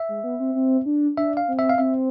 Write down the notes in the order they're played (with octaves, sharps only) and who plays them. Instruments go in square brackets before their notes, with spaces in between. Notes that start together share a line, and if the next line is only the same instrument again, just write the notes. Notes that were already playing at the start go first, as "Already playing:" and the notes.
Already playing: [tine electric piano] E5
[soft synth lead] G#3
B3
C4
C4
D4
[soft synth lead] D4 [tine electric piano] E5
[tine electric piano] F5
[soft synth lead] C4
[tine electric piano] E5
F5
[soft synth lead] C4 [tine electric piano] E5